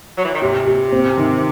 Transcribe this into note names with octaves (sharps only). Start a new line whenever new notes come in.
F#3
E3
D#3
C3 G4
G4
C4
D#3